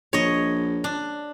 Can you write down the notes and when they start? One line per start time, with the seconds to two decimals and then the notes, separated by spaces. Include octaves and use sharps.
0.13 A#1 C#5 D#5
0.84 D4